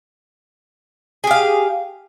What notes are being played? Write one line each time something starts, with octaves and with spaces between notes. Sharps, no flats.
G4 G#4 F5